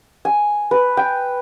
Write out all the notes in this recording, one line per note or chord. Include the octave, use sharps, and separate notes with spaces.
G#5
B4
G5